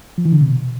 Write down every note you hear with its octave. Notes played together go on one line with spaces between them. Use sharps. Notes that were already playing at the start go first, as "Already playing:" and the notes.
F3
E3
D3
C3
B2